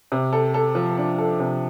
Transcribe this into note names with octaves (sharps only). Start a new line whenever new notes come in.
C3
A4
A4
F3
D4
A4
C3